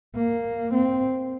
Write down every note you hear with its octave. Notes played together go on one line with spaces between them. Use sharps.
A#3
C4